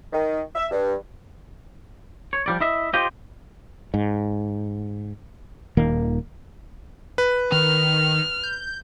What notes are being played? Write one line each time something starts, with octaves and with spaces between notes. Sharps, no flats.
D#3
E5
G2
C#5
F3 G3 D5
E4 D#5 E5
F4 G4 C5 D#5
G#2
D#1 D#3 A#3
B4
D#3 F6
G6